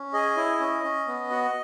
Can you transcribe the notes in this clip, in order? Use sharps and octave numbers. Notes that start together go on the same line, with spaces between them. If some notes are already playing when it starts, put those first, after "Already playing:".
Already playing: C#4
G#4 D#5
E4
C#4
C#4
B3
F#4